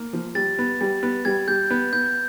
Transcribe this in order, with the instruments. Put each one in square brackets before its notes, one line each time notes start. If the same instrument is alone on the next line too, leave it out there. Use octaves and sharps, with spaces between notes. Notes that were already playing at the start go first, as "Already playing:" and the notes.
Already playing: [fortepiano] A#3
F3
[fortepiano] G3 [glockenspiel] A6
[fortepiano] B3
G3
B3
[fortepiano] G3 [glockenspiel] G#6
[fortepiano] G3 [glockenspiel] G6
[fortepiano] B3
[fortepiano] B3 [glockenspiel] G6